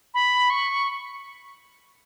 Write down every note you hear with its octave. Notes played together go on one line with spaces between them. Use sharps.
B5
C#6